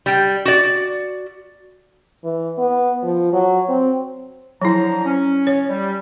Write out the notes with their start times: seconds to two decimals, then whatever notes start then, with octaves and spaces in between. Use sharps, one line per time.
0.06 G3 G5
0.45 F#4 D5
2.24 E3
2.58 B3
3.03 F3
3.32 F#3
3.69 C4
4.62 D3 F3 F#3 E4 A#5
5.05 C#4
5.47 C#5
5.68 G3